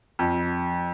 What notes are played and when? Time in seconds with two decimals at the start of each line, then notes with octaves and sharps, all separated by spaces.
0.19 F2